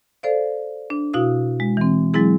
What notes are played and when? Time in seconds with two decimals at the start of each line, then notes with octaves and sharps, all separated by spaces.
0.23 A4 C5 D5 F5
0.90 D4
1.14 B2 E4 F#4 F5 D#6
1.60 G#3
1.77 E3 C4
2.14 F#3 G#3 C4 E4 G#4